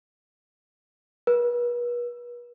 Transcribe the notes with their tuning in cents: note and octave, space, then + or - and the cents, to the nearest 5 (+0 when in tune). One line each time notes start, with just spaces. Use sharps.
B4 -40